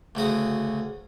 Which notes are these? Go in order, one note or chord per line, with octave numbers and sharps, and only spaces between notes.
D2 C#3 F#4 D#6